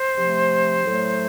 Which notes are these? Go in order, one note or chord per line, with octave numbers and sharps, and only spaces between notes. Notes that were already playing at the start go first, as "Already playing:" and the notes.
Already playing: C5
C3 F3 A3
A2 F#3 A3